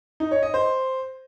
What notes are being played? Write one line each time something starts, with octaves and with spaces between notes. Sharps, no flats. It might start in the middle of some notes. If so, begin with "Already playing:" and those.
D#4
C#5
D#5
C5